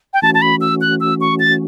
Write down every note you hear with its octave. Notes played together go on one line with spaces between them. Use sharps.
G5
E3 A3 C#4 F#4 A5
A5
B5
E6
F#6
E6
C#6
A6